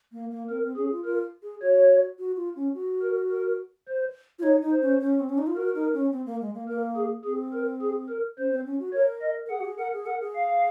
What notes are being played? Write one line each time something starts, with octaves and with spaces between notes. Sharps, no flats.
A#3
A#3
C4 A#4
C4
C#4 G#4
F4
F4 A#4
G#4
F#4 C#5
F#4
F4
C#4
F#4
A#4
A#4
C5
F4
D#4 C#5
D#4
C5
C#4
C#4
C4
C#4
D#4
F4
F#4 A#4
D#4
C#4
C4
A#3
G#3
A#3
A#3 A#4
G#4
C4 G#4
A#4
G#4
A#4
C#4 C5
C4
C#4
F#4
A#4 C#5
D#5
A#4
G#4 F#5
F#4
G#4
A#4 F#5
G#4
A#4 F#5
G#4
F5